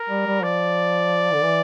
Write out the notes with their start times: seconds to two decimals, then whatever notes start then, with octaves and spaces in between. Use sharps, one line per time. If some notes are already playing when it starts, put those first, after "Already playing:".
Already playing: A#4
0.10 G3
0.27 G3
0.43 F3 D5
1.33 D3
1.43 E3